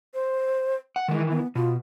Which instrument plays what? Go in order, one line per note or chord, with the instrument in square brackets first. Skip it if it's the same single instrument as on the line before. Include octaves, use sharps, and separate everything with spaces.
[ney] C5
[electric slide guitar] F#5
[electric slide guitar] D#3 E3 [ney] G#3
[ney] B3
[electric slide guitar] B2 [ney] F4